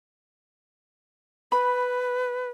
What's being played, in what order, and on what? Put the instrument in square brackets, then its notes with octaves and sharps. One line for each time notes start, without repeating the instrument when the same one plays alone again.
[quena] B4 [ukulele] B5